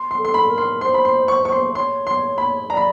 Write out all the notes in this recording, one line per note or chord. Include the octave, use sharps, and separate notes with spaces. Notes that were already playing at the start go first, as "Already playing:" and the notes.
Already playing: C6
C6
A4
C6
B5
A#4
C6
C5 C6
B5
C6
C#6
C#6
C6
C#5 C6
C6
B5
D5 A#5
B5